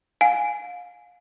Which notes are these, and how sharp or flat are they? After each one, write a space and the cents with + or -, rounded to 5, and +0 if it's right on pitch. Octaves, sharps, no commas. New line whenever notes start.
F5 +35 G#5 +0